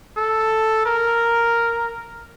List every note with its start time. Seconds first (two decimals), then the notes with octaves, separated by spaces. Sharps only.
0.17 A4
0.85 A#4